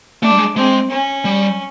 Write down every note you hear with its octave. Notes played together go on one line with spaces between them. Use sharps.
A3 D4
G3
G#3
G#3 C4
C#4
G3